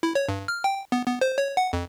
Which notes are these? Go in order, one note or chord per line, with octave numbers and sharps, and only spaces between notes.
E4
C#5
G2
F6
G5
B3
B3
C5
C#5
F#5
F2